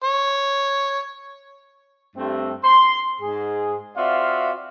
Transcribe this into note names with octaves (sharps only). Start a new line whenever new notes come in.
C#5
G2 A3 C4
C6
G#2 G#4
C4 F4 F#4 D5 E5 F5